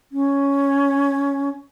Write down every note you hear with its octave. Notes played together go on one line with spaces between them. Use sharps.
C#4